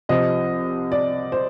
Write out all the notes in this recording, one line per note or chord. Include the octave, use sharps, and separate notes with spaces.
C2 C3 F3 D#5
D5
C5